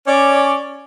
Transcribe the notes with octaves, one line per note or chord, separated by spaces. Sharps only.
C#4 C#5 D5